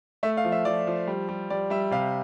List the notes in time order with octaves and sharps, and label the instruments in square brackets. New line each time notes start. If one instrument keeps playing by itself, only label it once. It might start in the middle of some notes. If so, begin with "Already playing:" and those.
[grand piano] A3 E5
F5
F3
E5
F3 D5
F3
G3
G3
G3 D5
G3 E5
C3 F5